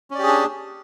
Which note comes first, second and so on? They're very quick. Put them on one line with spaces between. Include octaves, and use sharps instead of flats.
C#4 D5 G4 G#4 D4